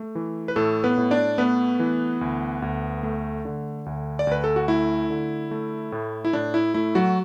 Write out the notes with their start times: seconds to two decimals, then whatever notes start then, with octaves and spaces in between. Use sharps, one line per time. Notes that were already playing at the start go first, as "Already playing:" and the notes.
Already playing: A3
0.15 E3
0.48 B4
0.56 A2 A3 A4
0.84 B3 B4
0.98 A2
1.11 D4 D5
1.38 A3 B3 B4
1.79 E3
2.21 D2
2.62 D2
3.03 A3
3.45 D3
3.86 D2
4.19 D5
4.27 D2 B4
4.44 A4
4.56 F#4
4.68 A3 E4
5.10 D3
5.51 A3
5.92 A2
6.25 E4
6.33 A2 D4
6.54 E4
6.74 A3 E4
6.95 F#3 F#4